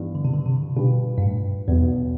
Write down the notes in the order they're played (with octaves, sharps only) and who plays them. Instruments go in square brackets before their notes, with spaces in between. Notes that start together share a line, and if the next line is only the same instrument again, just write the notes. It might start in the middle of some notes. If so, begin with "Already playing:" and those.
Already playing: [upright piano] G2 E3 B3
[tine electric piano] D3
C3
D3
C3
[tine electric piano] B2 [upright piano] D3 G3 D4 F4 B4
[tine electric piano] G2
A2
[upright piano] B1 B2 B3 [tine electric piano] E2